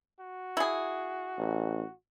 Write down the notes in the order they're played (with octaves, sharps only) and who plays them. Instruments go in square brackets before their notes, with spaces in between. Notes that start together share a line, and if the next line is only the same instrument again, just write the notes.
[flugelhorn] F#4
[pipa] E4 G#4
[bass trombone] A1